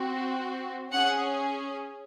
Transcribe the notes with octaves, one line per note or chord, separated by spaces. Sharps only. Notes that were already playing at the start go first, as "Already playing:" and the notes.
Already playing: C4 F#4
C#4 G#4 F#5